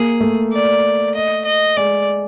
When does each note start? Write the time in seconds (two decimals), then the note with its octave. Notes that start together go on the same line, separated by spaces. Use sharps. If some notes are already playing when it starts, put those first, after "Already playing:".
Already playing: A#3 G#4
0.21 A3
0.52 D5
1.15 D#5
1.45 D#5
1.77 G#3 D5